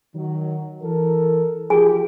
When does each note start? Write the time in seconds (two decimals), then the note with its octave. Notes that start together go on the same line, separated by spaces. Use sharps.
0.15 D#3 F#3
0.82 E3 A4 A#4
1.70 F3 F4 G4 G#4 G#5